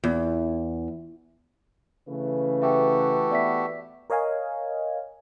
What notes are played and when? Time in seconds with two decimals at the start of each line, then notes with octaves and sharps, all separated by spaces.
0.04 E2
2.08 C#3 E3 A3 B4
2.62 F#4 G4 A4 E5 G5
3.31 B3 D5 E5 B6
4.10 A#4 C#5 D#5 F5 G#5